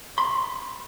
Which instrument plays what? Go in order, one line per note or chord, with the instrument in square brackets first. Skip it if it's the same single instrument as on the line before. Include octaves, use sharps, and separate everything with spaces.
[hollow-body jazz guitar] B5 C6